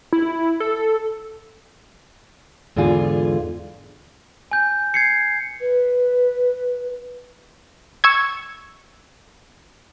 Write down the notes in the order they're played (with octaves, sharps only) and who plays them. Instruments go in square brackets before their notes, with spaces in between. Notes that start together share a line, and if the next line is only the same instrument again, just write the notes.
[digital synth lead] E4
A4
[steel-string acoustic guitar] E2 G#2 D3 E3 F4 G#4
[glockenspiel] G#5 G6
G#6 C7 C#7
[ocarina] B4
[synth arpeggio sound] C#6 E6 G#6